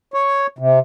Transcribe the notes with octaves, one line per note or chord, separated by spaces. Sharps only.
C#5
C3